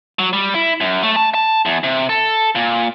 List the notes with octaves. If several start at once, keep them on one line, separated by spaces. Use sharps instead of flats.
F#3
G3
E4
F#2
A3
A5
A5
E2
C3
A4
A#2